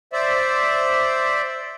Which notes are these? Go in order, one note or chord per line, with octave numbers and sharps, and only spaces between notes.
C5 D5 E5